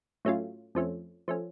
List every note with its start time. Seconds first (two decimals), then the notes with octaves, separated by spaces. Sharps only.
0.25 A2 F#3 A3 C#4 F4
0.75 F2 F3 A3 C#4
1.28 F3 A3 C#4